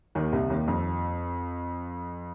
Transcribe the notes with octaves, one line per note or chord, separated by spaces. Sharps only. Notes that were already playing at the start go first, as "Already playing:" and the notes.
D#2 D#3
C2 C3
D#2 D#3
F2